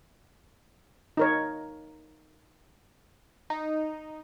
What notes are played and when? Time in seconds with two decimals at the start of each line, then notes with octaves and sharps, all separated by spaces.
1.17 D#4 A#4 C#5
3.50 D#4